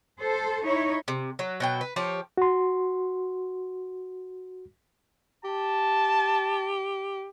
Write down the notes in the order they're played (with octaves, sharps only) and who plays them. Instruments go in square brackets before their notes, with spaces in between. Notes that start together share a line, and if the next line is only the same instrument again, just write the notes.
[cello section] A4 C5
D#4 E4 C#5
[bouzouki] C3
F#3
B2 F#3 G5
B4
F3 G4 C#5
[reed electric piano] F#4 C6
[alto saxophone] G4 [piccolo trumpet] A5